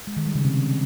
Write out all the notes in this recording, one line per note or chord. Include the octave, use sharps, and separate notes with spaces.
G#3
D#3
G3
C#3
C3